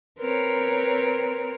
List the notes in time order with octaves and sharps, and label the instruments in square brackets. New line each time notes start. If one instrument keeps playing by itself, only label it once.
[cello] C4 A#4 [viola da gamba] B4 C#5